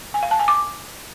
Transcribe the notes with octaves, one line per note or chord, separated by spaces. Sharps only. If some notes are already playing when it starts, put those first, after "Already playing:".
G#5
F5
A5
G#5
D6